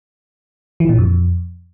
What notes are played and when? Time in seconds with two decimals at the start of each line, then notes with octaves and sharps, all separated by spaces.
0.80 E3
0.89 A#2
0.98 F2